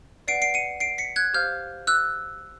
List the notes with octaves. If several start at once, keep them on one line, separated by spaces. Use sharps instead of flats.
B4 D5 F#5 C7 D7
C7 D7
C#7 D#7
C7 D7
B6 C#7
F#6 G#6
G4 C5 F5 F6 G6
E6 F#6